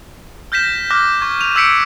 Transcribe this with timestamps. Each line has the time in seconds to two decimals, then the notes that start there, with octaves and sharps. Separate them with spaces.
0.52 F6 G6 A#6 B6 E7
0.91 D6 F6 F#6 A#6
1.21 C#6 G#6
1.39 D#7 F7
1.56 E6 G#6 B6 C#7 D7